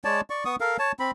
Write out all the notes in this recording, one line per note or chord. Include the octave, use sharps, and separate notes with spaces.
G#3 C#5 D5 A5
D5 C#6
B3 C#6 D#6
A4 A#4 F5
C#5 A5
C4 B5